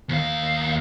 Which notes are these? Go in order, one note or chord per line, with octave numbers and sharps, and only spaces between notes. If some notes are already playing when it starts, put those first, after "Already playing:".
D#2 F5